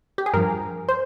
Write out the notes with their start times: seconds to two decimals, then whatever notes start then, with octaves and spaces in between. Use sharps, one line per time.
0.18 G4
0.26 G#4
0.33 G2 F3 A#4
0.89 C5